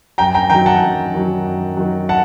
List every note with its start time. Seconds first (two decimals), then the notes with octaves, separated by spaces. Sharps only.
0.18 F#2 G5 A#5
0.35 G5 A#5
0.50 D#3 G5 A#5
0.54 F#3
0.66 F#5 A5
0.83 F#2
1.14 D#3 F#3
1.46 F#2
1.77 D#3 F#3
2.09 F#5 A5